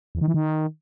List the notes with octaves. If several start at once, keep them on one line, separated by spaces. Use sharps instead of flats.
E2
D#3
E3
D#3